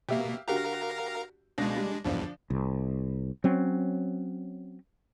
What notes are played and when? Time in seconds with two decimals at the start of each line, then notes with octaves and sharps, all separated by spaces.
0.09 B2 A#3 G4 E5 F5
0.48 D3 F#4 G4 A#4 F5 A#5
1.58 C#2 B2 G#3 D4 A#6
1.76 G3
2.05 B1 E2 G2 D3 F3 D4
2.50 C2
3.44 F#3 C4 C#4